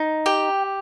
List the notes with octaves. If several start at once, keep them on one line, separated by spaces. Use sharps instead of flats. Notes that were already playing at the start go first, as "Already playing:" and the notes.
Already playing: D#4
G4 G5